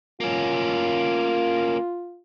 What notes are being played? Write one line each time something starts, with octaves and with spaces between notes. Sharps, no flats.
A#3 C#4 F4